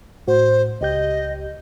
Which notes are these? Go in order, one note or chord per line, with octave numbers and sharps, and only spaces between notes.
A2 F#4 C5
C#2 G4 D#5 G6